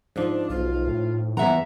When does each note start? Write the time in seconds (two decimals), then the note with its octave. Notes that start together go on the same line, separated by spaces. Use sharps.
0.16 G#2 F3 D4
0.50 B1 F4
0.87 A2
1.37 E2 E3 E5 F#5 A#5